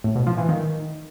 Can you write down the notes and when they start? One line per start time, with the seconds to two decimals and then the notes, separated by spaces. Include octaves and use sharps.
0.04 A2
0.15 B2
0.27 F3
0.38 E3
0.49 D#3